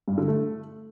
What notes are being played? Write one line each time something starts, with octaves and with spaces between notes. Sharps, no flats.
G2
D3
A3